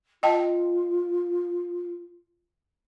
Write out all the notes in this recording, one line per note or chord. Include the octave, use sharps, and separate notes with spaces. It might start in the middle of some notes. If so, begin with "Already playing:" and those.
F4 D#5 G5 A5